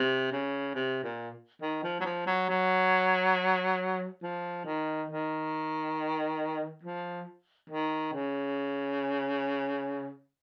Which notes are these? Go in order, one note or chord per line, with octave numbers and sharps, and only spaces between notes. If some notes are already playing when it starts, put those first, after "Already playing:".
Already playing: C3
C#3
C3
A#2
D#3
F3
F#3
F3
F#3
F#3
F3
D#3
D#3
F3
D#3
C#3